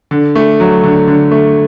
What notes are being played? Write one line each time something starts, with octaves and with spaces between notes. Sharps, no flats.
D3
A3
F#3
D3
D3
A3